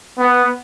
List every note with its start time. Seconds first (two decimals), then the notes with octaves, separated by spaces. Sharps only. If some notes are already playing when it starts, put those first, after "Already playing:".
0.18 B3